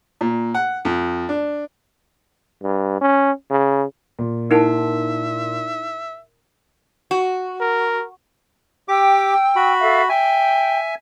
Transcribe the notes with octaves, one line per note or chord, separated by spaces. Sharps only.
A#2
F#5
F2
D4
G2
C#4
C#3
A#2
D#4 E4 A#4 E5 F#5 A5
F#4
A#4
G4 G5 D6 E6
F#4 B5
A4 E5 F5
E5 G5 G#5